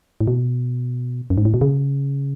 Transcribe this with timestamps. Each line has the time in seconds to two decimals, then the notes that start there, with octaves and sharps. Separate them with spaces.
0.21 A2
0.27 B2
1.30 F#2
1.38 G#2
1.45 A2
1.54 B2
1.61 C#3